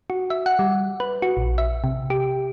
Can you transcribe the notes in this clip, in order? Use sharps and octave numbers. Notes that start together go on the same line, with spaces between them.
F#4
E5
F#5
G3
B4
F#4
A#1
E5
C3
G4